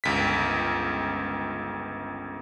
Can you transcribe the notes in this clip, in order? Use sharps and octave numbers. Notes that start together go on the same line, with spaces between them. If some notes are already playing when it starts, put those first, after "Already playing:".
G1 C#2 B6